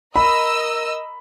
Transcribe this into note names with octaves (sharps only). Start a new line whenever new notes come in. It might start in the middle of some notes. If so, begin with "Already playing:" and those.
A#4 D#5 B5 E6